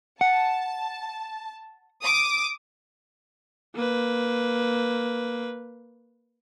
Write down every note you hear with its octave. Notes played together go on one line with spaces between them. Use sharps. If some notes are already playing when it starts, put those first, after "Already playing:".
F#5 A5
D6 D#6
A#3 B4